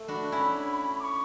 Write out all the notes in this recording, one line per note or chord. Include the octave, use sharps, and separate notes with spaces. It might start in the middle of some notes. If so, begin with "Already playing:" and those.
Already playing: A3
D4 F#4 B5
C#4 E4
D6
C#6